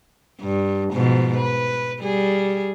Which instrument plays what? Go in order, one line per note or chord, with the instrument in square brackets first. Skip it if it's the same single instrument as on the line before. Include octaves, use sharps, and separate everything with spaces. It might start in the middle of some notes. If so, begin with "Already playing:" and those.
[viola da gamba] G2
G#2 B2 F3
B4
G3 G#4